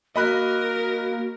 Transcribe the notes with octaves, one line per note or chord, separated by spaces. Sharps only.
A#3 F#4 A#4 D#5 B5 F#6